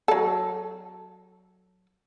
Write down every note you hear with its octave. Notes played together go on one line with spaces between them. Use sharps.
F#3 A4